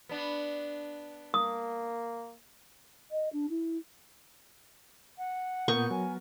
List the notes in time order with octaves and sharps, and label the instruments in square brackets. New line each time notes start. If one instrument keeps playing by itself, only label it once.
[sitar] B3 D4
[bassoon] A#3 [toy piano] D#6
[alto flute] D#5
D4
E4
F#5
[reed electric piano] A#2 D#6 G6 [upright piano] B3 A#4 [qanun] C#6
[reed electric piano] F#3 [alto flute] G#5